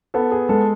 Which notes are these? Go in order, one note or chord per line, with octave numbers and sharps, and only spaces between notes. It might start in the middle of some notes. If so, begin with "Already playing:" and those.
B3 A4
G#4
G#3 A4